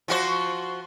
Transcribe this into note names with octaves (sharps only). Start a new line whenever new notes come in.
F3 F#4 C5